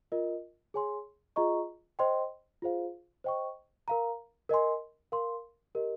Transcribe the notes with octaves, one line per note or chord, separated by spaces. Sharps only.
F4 A#4 D#5
G#4 C#5 G#5 C6
F4 G#4 D#5 A#5 C#6
C5 D#5 G5 C6
F4 G#4 C5 F5
C5 D#5 G5 C#6
A#4 F5 A#5
A#4 D#5 G#5 C6
A#4 F5 C6
G4 A#4 D#5